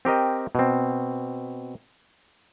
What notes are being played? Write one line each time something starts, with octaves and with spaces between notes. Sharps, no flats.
C4 G4 A#4 D#5
B2 C4